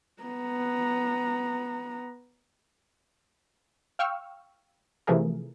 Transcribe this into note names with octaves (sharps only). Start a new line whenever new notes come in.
B3 A#5
F5 G5 C#6 E6 F6
C3 E3 F3 A3 G#4 A#4